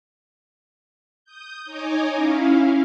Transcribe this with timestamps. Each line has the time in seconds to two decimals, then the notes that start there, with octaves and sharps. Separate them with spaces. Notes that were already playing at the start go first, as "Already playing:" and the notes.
1.25 D#6 G6
1.65 D#4 C#5 D#5 G#5 A#5 D6
2.14 C#4 E4 F5